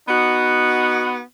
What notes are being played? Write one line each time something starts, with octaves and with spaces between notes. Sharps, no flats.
B3 D#4 F#4